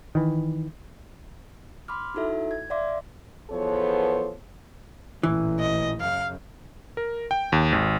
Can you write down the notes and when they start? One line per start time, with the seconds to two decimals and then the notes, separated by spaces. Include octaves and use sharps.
0.15 D#3 E3
1.88 B5 C6 D6 F6
2.14 D#4 E4 F#4 A4 E5
2.51 G#6
2.70 D5 E5 F5 C6 D6
3.50 E2 F3 B3 A4 C5 C#5
5.23 A1 A#2 E3
5.59 D#5
6.00 F#2 C#3 F5
6.97 A#4
7.31 G5
7.52 D#2
7.72 G#1